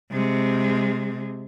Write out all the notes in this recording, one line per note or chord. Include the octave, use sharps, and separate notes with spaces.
C3 G#3